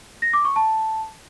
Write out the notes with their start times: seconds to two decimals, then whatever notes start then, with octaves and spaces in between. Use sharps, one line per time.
0.22 A#6
0.33 D6
0.45 C#6
0.56 A5